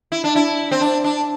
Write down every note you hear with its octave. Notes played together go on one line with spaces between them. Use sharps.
E4
D4
E4
C4
D4
D4